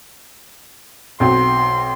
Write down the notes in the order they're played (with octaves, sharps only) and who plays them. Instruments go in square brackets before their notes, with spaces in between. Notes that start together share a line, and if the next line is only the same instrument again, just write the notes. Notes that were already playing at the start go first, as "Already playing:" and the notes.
[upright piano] B1 C4 F#4 [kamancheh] C6